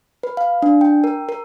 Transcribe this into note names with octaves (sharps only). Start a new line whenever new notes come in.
B4
F5
D4
G5
A#4
A#4